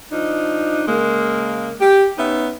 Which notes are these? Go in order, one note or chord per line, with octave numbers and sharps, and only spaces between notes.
F3 D4 D#4
C#3 G#3 A#3
G4
B3 C#4 D#4 E5